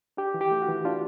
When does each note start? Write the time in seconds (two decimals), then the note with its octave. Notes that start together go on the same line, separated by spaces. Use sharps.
0.17 D4 G4
0.34 E3
0.41 G4
0.51 A3
0.62 F#4
0.68 E3
0.85 D4 F4